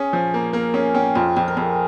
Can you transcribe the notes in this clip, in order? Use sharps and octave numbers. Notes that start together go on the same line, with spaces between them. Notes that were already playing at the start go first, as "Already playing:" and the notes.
Already playing: C#4 G#4
F3
A#3
A#3 A#4
C#4 G#4
C#4 G4
F2 F4
F2 G4
A#4
F2 G#4